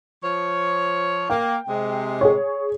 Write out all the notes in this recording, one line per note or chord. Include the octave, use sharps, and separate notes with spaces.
F3 C#5
A#3 G5
C3 G#3
G#4 C#5